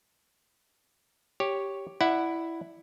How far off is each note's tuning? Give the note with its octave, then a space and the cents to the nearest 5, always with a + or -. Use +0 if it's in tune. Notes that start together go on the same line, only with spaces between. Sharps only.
G4 +0 C#5 +0
E4 +0 D5 +30 F#5 +0